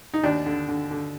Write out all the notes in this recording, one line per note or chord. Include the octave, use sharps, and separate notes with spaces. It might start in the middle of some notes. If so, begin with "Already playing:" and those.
D#4
D#2 D4
D3
D3
D3